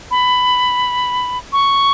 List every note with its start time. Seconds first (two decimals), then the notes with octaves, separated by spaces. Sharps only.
0.11 B5
1.53 C#6